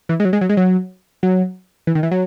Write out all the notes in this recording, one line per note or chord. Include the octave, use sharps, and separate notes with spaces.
E3
G#3
F#3
G#3
F#3
G#3
F#3
F#3
E3
D#3
E3
F#3